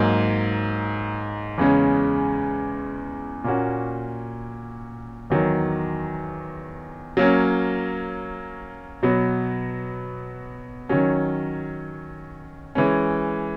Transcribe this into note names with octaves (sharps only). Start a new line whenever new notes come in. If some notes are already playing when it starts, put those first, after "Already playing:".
Already playing: G#2 F#3 A#3
E2 C#3 G#3 C#4
A#2 A#3 C#4 F#4
E2 D#3 F#3
F#3 A#3 C#4
B2 F#3 B3
D#3 F#3 C#4
E3 G#3 C#4